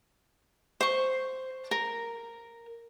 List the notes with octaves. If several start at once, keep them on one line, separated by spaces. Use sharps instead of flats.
C5 C#6
A#4